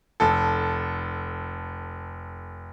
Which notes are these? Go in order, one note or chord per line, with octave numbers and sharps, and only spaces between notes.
F1 A4